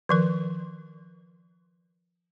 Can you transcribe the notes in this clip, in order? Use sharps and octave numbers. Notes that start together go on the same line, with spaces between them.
D#3 F3 A#4